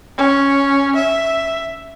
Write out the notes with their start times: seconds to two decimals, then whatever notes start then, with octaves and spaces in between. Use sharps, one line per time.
0.18 C#4
0.96 E5